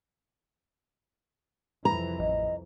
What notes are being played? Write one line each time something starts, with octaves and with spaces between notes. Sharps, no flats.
C2 F2 E3 A#5
A1 D#5